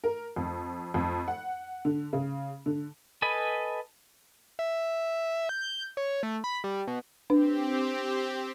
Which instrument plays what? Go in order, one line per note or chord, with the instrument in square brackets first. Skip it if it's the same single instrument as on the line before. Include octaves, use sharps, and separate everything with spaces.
[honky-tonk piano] A#4
F2
F2
F#5
D3
C#3
D3
[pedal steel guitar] A4 B4 D#5 G#5 B5
[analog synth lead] E5
G6
C#5
A3
B5
G3
B2
[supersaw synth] C4 G4 [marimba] D4 B4